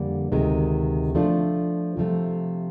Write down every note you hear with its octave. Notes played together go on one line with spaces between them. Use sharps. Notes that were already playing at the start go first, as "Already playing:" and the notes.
Already playing: F2 D3 G3 A#3 D4
D2 C3 D#3 G#3
F3 A3 D4 F4
C3 F3 A3